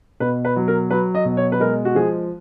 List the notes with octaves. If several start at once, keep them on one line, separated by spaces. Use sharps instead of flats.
B2 B4
B4
F#3
A#4
F#3 B4
D#5
B2
C#5
B4
G#3 A#4
F#4
F3 G#4